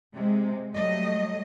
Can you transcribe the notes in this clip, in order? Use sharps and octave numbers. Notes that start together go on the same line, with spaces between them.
C3 G#3
F#3 G3 A3 D#5